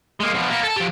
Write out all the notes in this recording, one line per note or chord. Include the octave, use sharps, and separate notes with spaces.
G#3 A#3
B2 F3
A#3 B3
A4 A5
F3 G4